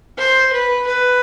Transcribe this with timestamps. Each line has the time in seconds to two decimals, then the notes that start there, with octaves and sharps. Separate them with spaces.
0.18 C5
0.52 B4
0.86 B4